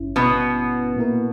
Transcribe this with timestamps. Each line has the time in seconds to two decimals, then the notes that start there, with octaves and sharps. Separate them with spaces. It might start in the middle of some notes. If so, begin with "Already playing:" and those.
Already playing: G#1 G2 C#4 E4
0.16 B2 B3
0.96 A#2 A#3 E4 A#4